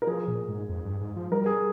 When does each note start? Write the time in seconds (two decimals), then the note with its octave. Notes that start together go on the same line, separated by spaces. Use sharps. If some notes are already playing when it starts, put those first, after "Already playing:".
0.02 A#4
0.07 F3 G#4
0.28 A#2
0.48 G#2
0.69 F2
0.85 G2
1.01 G#2
1.16 F3
1.31 G3 A#4
1.46 G#4